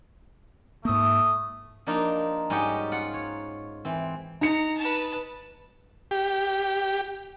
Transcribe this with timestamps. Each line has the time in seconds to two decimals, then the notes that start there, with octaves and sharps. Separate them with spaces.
0.85 G#2 A3 A#3 E5 D#6
1.87 F3 A#3 D4 D#4 F4
2.50 G#2 G3 C#4 F#4 G4 D#5
2.92 F4 F#5
3.14 C#5
3.85 E3 C4
4.41 D#4 A#5 C#7
4.77 B4 A5
6.11 G4